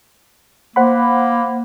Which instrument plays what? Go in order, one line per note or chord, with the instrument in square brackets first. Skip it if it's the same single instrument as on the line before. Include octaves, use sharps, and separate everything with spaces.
[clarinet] A#3 [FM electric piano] C5 F#5 B5